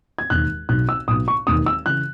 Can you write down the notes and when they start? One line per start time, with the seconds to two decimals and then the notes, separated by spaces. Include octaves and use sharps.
0.18 G#6
0.30 E1 D#2 D#3 F#6
0.69 B1 B2 F#6
0.89 E6
1.08 B1 B2 D#6
1.28 C#6
1.47 E1 D#2 D#3 D#6
1.66 E6
1.86 C#3 E3 F#6